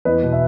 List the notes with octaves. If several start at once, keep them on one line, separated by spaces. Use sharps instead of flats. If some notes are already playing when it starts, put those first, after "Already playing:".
E2 B4 D#5
B2
E5